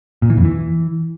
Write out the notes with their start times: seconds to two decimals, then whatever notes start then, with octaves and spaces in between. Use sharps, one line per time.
0.22 A#2
0.30 E3
0.37 F2
0.45 E3